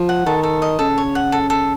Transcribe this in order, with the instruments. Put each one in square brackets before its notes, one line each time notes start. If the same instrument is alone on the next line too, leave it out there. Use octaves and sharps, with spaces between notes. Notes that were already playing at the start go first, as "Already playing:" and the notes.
Already playing: [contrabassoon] F3
[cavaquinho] F#5
[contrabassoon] D#3 [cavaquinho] A4
[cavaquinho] A4
D#5
[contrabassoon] C#3 [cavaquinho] A4
[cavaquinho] C#5
F#5
A4
A4